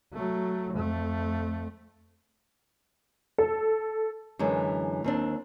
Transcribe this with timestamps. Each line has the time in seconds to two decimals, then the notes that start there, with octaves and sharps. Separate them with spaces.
0.13 F#3 A3
0.73 F2 A3
3.38 A4
4.39 F#2 D3 E3 G#3
5.04 D#2 C4 D4